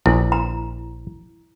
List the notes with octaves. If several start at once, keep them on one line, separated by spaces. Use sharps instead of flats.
A#1 E4
A#5